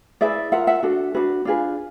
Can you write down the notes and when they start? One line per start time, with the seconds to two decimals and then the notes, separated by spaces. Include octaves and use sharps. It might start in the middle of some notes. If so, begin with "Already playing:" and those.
0.21 E4 G#4 B4 D5 E5
0.52 F4 A#4 E5 F#5
0.67 E5 F#5
0.83 D4 F#4 A4
1.15 D4 F#4 B4
1.45 D4 F4 G#4 B4